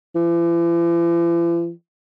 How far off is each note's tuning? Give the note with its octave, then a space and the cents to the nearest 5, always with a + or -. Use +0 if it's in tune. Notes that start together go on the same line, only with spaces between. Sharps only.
E3 +45